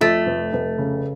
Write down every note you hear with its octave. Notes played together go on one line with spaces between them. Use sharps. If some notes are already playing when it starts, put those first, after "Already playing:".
F2 A3
F1
F1
C#3